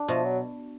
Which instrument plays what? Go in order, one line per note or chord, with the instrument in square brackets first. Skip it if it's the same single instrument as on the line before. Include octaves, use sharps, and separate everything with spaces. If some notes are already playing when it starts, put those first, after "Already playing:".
Already playing: [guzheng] D4
[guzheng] B2 [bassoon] F3
[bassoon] F#3